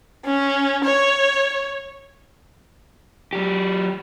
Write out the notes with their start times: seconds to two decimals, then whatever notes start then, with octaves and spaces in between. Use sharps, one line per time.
0.25 C#4
0.85 C#5
3.33 F#3 G4